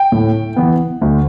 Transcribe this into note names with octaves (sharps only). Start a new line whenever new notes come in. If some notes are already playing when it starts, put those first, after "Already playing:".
Already playing: G5
A2
E3 B3
D2